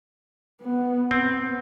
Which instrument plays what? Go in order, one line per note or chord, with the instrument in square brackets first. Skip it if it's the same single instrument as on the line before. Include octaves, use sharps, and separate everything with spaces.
[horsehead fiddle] B3
[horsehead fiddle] B3 [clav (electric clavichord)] C4